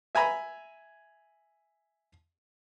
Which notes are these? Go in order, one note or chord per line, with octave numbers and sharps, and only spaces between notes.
E5 G#5 A#5 B5